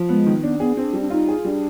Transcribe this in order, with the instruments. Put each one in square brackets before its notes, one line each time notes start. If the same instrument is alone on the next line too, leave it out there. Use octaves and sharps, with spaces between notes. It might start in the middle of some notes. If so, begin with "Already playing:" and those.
Already playing: [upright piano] F3
[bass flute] G#3 [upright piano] B3
[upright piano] D#3
[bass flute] B3 [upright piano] D4
[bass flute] B3 [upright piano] G#4
[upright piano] C4 [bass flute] D4
[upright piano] G3
[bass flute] D4
[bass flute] D#4 [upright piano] F4
[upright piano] G#4
[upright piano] G3 [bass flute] D4